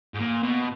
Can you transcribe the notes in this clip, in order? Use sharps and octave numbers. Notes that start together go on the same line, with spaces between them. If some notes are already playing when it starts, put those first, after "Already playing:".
G#2
A#2
B2